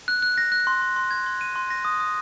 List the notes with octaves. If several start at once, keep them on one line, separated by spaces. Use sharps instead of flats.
F#6
F#6
A#6
F#6
C6
C6
C6
G#6
C6
D#7
C6
A#6
D#6
D#6